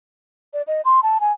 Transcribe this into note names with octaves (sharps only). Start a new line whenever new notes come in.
D5
D#5
C6
A5
G#5